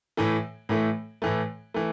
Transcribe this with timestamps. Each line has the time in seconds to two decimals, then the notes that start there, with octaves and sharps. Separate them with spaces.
0.17 A2 E3 A3
0.69 A2 E3 A3
1.22 A2 E3 A3
1.74 E3 A3